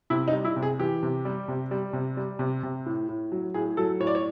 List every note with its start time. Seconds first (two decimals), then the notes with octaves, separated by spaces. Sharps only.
0.10 C3 E4
0.28 D#4
0.33 G3
0.45 E4
0.56 C3
0.63 G#4
0.79 E3 G4
1.03 C3
1.25 G3
1.48 C3
1.71 G3
1.93 C3
2.17 G3
2.39 C3
2.63 C3
2.86 A2
3.09 A2
3.32 F#3
3.54 A2 G#4
3.77 F#3 A4
4.00 A2 C#5
4.07 D5
4.15 C#5